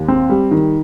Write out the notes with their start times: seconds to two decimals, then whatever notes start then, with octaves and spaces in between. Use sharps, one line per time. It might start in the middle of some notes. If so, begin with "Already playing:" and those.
Already playing: D#2
0.08 C4
0.30 G3
0.51 D#3